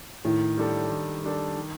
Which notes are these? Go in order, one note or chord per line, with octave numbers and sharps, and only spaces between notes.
A2 D#3
G3 D4 A4
D#3
G3 D4 A4
D#3